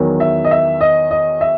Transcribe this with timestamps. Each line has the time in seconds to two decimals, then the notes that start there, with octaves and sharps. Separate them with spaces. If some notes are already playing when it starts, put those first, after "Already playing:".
Already playing: E2 D#3 F#3
0.20 E5
0.44 D#5
0.51 E5
0.81 D#5
1.11 D#5
1.41 E5